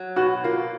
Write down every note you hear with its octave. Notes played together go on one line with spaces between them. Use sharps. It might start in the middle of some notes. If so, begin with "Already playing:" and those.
Already playing: F#3
B2 F#4
A#3 F4